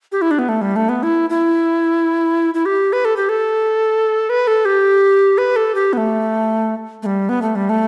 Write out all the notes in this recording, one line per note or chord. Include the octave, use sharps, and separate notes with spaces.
G4
E4
D4
B3
A3
G3
A3
B3
E4
E4
E4
G4
B4
A4
G4
A4
B4
A4
G4
B4
A4
G4
B3
A3
A3
G3
B3
A3
G3
A3